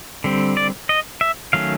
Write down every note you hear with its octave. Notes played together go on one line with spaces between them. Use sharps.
D3 G3 C4
D5
D#5
E5
D#3 F#3 A3 C#4 F5